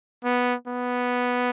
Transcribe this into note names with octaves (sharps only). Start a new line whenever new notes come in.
B3
B3